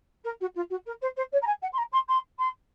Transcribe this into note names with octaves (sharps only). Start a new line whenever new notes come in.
A#4
F#4
F4
F#4
A#4
C5
C5
C#5
A#5
G#5
F#5
C6
A#5
C6
C6
C6